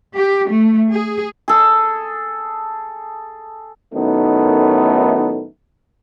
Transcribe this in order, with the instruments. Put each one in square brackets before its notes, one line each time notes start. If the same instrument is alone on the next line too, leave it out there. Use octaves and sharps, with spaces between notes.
[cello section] G4
A3
G#4
[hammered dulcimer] G#4 A4
[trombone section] F#2 A2 D#3 A3 B3 D#4